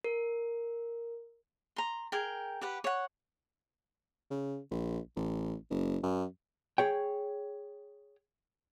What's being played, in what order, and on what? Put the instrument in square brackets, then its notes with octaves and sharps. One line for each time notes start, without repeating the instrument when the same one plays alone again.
[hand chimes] A#4
[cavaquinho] A#5 C6
G#4 A#4 G5
G4 B4 F#5
C#5 F#5
[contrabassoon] C#3
A#1
A1
F#1
F#2
[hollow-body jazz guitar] G#4 C#5 G5